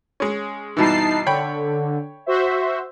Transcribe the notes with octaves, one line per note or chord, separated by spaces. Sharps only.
G#3 C#4
G2 B2 E3 D#4 A5 C7
D3 C#5 G5 B5
F#4 C5 E5